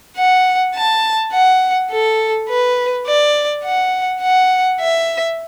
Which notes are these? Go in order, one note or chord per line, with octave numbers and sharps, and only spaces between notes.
F#5
A5
F#5
A4
B4
D5
F#5
F#5
E5